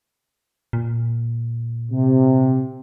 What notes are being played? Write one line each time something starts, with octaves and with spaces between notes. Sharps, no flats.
A#2
C3